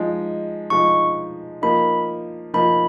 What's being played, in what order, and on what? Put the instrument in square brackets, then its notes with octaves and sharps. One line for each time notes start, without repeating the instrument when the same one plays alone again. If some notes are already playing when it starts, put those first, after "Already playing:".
Already playing: [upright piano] F3 G#3 D#4
[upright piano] F3 G#3 D#4 [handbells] C#6
[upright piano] F3 A#3 D#4 [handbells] B5
[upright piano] F3 A#3 D#4 [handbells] B5